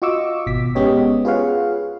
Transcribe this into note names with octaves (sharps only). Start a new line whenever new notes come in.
F4 F#4 D#5 C#6 D6 E6
G#1 B2 D6 B6
G#3 B3 C#4 G4 C#5 D#5
F4 G#4 B4 C#5 F5 F#5